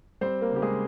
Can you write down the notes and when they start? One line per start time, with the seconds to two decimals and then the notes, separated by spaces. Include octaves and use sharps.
0.21 G3 C4 C5
0.41 A#3 A#4
0.51 C#3 G4
0.62 G#3 G#4